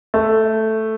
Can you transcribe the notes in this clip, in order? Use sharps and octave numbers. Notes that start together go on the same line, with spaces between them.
A3